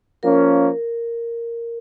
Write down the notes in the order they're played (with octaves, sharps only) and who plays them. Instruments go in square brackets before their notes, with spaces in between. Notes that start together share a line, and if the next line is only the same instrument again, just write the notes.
[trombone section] F3 A#3 C#4 [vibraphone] A#4